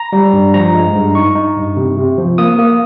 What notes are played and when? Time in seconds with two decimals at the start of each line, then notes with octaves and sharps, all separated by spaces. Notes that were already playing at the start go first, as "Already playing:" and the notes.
Already playing: A#5
0.13 G3
0.33 G2
0.54 F3 A#5
0.74 G#3
0.95 G2
1.15 D#4 C#6
1.35 D#4
1.56 G2
1.77 C3
1.97 C3
2.18 F3
2.38 A#3 D#6
2.59 A#3